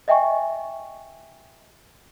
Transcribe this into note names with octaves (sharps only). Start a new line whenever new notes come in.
D#5 E5 G5 G#5 C#6